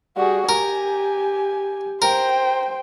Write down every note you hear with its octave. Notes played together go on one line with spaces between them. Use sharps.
G3 F#4 G#4
G4 A#4 G#5
A#4 C5 G5